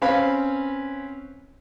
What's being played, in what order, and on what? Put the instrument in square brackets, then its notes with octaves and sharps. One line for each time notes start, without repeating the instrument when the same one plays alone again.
[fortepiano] C4 C#4 B4 C#5 F5 B5